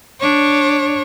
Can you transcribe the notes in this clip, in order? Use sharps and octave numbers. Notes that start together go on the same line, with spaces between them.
D4 C#5